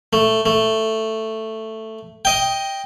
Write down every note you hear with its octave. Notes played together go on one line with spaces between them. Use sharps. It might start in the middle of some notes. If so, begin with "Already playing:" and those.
A3
A3
D#5 G5